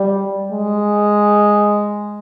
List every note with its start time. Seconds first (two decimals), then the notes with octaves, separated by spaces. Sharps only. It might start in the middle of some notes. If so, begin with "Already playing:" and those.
Already playing: G3
0.52 G#3